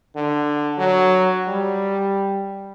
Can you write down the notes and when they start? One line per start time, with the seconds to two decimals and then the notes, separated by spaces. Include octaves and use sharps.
0.16 D3
0.78 F#3
1.48 G3